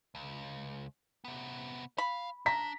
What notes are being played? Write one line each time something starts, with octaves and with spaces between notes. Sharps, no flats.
C#2
C3 B3
F5 B5
D4 A#5 B6